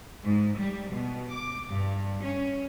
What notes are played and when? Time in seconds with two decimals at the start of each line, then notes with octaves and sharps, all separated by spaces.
0.24 G#2
0.58 G3
0.93 B2
1.34 D6
1.68 G2
2.24 C#4